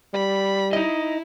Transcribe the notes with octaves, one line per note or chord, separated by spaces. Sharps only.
G3 B5
D#4 E4 D#5